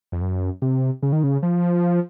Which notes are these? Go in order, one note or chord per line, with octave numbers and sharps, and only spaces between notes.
F2
F#2
C3
C#3
D#3
C#3
F3